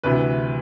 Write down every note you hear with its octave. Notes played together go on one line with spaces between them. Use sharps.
D2 C3 E3 B4